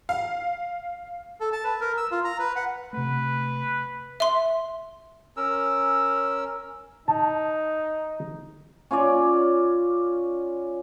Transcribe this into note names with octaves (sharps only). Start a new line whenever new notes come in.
F5
A4
A5
B4
A#4
E6
F4
A#5
B4
F#5
C3 A3 B4
E5 C6
C#4 A#4 E6
D#4 A5
C#4 F4 C#5 D5